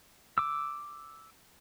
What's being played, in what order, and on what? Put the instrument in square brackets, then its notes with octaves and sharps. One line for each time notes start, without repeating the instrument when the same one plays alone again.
[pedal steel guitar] D6 E6